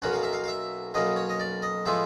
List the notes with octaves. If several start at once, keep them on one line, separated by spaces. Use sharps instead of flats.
B1 B2 F#3 A#3 C#4 F#5
F5
E5
F5
F5
E5
B1 B2 F#3 A#3 C#4 D#5
C#5
D#5
D5
D#5
A2 F3 G#3 B3 E5